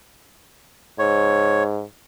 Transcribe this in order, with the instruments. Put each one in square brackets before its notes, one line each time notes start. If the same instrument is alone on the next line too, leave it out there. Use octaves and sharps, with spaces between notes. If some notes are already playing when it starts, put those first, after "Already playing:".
[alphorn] G#2 [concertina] C#5